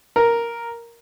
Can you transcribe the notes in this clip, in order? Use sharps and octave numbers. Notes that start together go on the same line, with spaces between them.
A#4